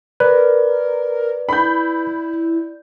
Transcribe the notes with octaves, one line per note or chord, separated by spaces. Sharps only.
A#4 B4 D5
E4 B5 G6